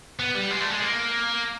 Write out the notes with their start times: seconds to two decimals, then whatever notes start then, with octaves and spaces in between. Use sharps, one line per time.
0.20 B3
0.35 G3
0.51 G#3
0.61 A3
0.72 G#3
0.83 A#3